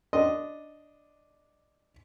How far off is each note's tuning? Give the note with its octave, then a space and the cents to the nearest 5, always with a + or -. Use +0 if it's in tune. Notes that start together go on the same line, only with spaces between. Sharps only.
D4 +0 D#5 +0 C6 +0